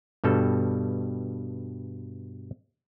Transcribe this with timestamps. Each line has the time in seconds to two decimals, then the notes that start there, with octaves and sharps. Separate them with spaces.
0.24 G2 B2 G3 A4